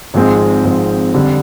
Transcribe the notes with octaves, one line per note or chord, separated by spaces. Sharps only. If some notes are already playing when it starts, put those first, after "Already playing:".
G#1 G#2 F3 G#3 C4
G#1 G#2 F3 G#3 C4
F2 D3 G3